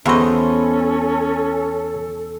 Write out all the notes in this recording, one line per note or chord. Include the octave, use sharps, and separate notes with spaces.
E2 C#4 E4 F#4 A4 C5 D#5